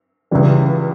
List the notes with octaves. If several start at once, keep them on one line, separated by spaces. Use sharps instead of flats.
C#2 C#3 E3 G3